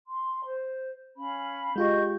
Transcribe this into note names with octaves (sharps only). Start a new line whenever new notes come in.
C6
C5
C#4 F5 B5
G#3 F4 G4 D#5 C#6 G6